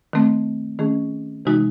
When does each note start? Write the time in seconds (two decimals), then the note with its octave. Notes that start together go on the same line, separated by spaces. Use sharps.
0.13 D#3 A3 C4
0.79 D#3 A3 C#4 G#4
1.45 C3 E3 G#3 D#4 F#4